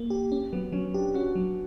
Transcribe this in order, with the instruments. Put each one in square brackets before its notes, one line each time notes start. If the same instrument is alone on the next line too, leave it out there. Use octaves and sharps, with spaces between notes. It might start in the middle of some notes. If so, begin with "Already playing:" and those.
Already playing: [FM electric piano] A#3
G4
C#4
[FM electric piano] F#3 [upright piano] B3
[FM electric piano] F#3 [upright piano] C#4
[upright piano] D4 [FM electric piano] G4
[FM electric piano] C#4 [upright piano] F#4
[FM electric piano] F#3